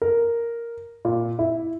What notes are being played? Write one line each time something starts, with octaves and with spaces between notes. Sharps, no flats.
A#4
A#2
E4